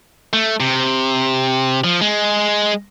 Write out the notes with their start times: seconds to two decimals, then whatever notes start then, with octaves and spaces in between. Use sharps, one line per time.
0.33 A3
0.60 C3
1.84 F3
2.01 G#3